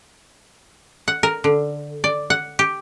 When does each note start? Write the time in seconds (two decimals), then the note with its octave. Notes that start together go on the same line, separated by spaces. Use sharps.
1.08 F#5
1.23 A#4
1.44 D3
2.04 D5
2.30 F#5
2.59 G4